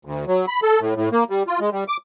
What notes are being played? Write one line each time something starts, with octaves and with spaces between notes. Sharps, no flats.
D2
F#3
B5
A4
A2
A2
A#3
G3
F4
G#3
G3
D6